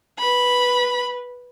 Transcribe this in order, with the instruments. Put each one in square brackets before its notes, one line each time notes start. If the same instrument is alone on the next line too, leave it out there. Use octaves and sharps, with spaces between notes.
[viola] B4 [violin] B5